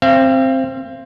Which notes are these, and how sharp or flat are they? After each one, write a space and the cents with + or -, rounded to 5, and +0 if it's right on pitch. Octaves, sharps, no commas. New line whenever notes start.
C4 +10 F5 -40